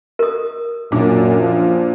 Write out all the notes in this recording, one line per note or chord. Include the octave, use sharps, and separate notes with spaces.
A#4 D#6
F#2 A#2 D4
F3